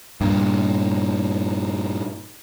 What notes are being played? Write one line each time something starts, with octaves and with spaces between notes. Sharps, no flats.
G2 A#2